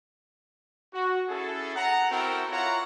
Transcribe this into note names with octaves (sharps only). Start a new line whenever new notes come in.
F#4
C#4 E4 G#4 A4
F#5 A#5
C4 E4 F#4 A4 A#4 G5
E4 F4 C#5 F#5 A#5